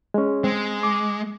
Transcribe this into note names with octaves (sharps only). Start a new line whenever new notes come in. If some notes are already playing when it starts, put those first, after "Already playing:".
G#3 C#4
G#3 C4
D6